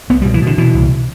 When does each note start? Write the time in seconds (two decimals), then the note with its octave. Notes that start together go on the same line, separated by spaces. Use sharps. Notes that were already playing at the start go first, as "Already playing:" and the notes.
0.10 C2 B3
0.22 G3
0.25 B2
0.34 E3
0.42 B2 D3
0.58 B2 E3
0.74 C2